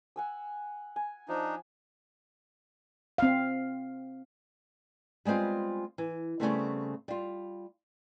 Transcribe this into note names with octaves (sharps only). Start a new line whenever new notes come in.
F#5 G#5 E6
G#5
F3 D4 D#4
C4 F5
G3 G#3 B3 C4 F4
E3
C#3 F3 G3 A3 B3 C4
G3 F4